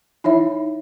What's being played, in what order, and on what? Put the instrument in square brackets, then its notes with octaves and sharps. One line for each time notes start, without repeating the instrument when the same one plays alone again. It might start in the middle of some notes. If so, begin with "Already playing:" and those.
[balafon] D#4 E4 C#5 E5